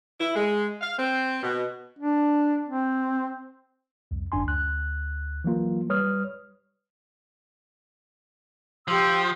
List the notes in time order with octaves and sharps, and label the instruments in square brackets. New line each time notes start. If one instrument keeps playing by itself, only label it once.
[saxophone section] E4
G#3
F5
C4
B2
[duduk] D4
C4
[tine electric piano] C2 F2
G1 F#2 D4 G#5 C6
D2 F#6
E3 F#3 A#3 F4
G3 B4 C#5 D#6 F6
[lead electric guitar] F3 [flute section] G4 C6 E6